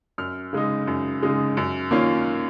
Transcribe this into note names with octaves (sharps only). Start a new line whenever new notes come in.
F#2 F6
C#3 G#3 D#4
F#2
C#3 G#3 D#4
F#2
D#3 A#3 C#4 F4